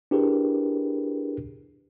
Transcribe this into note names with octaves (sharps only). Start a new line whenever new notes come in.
D4 E4 G4 G#4 A#4 B4